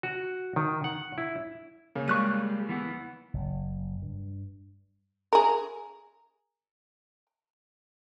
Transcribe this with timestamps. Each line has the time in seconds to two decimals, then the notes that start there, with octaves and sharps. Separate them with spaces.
0.03 F#4
0.56 D#3
0.84 F#5
1.18 E4
1.95 C#3 A#3
2.08 G3 G#3 C#6 F#6 D#7
2.69 E3 B3
3.34 F#1
4.02 G2
5.33 G#4 A#4